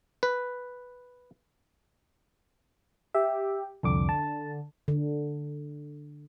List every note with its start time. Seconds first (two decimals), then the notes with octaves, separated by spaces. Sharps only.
0.23 B4
3.15 G4 E5
3.83 C2 F2 D3 D6
4.09 A5
4.88 D3